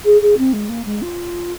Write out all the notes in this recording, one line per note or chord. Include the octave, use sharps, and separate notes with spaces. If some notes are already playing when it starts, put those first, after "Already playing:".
G#4
G#4
C4
G#3
A#3
G#3
F4